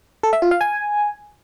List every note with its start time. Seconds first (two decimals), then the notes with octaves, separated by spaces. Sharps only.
0.23 A4
0.33 E5
0.42 F4
0.51 F5
0.61 G#5